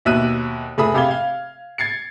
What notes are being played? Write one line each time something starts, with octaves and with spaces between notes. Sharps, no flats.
D#2 B2 E5 E6 F#6 D#7
F1 G#4 A4 E5 B5 D#6
C3 G4 F5 B5 G#6 G7
F5
G#6 A6 C7 C#7